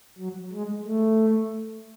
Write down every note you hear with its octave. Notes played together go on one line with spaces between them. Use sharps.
F#3
G#3
A3